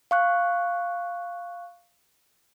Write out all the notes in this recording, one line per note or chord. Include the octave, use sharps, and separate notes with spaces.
F5 C#6 F#6